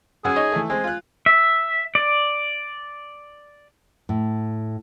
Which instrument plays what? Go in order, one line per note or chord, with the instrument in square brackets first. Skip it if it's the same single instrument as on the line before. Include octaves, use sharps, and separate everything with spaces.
[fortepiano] F#2 F#5 E6 [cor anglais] G#4
[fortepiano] D#4 C#5 D#5
E3 A3
[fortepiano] G#3 C4 [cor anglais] G#5
[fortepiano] F4 F#6
[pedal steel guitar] E5
D5
[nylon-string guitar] A2